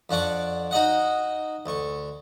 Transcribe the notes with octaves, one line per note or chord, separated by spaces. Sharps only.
F2 D4 F#5 C#6 D6
D#4 F#4 D#5 F#5
D2 C#6